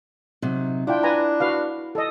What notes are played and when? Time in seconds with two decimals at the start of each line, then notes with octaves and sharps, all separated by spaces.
0.42 C3 F#3 D#4
0.87 D4 E4 F4 G5
1.03 B4 G#5 A#5
1.40 F#4 B4 F5
1.95 A4 D#5